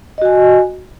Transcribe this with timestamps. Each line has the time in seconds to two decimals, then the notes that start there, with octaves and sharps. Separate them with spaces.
0.18 D#5
0.22 F#4
0.25 G#5